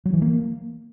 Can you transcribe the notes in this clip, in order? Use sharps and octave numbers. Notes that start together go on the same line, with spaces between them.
F#3
E3
A#3